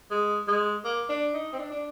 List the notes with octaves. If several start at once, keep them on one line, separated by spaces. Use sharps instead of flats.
G#3
G#3
A#3
D4
D#4
C4
D4
D4